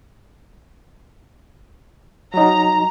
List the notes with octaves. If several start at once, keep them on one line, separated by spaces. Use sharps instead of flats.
F#3 D#4 A#5